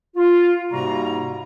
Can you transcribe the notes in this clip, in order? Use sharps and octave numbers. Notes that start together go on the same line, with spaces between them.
F4
G#2 C3 G3 A#3 F#4 A#5